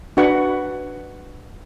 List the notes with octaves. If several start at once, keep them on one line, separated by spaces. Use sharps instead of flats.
D4 F#4 B4 F#5 C#6